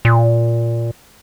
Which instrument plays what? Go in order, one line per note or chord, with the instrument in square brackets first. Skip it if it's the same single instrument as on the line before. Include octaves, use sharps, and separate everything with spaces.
[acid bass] A#2